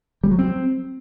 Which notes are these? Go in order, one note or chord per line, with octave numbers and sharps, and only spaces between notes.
G3
F#3
C4